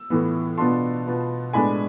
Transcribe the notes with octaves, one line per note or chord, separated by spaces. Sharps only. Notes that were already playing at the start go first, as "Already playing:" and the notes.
Already playing: E6
A2 E3 B3
B2 B3 D4 F4 A5 C6
B2 B3 F4
A2 G#3 B3 D4 G#5 B5